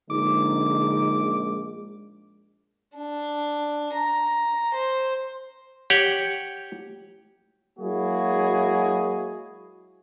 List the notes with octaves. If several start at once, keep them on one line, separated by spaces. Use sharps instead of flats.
A#1 D3 G#3 D#4 D6
D4
A#5
C5
G4 C#5 F#5 G5
F#3 G#3 A#3 E4 F#4 G#4